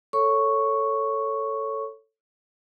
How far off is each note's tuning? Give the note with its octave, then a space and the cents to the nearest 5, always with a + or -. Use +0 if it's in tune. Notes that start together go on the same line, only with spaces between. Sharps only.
A4 +10 C#5 +0 C#6 +0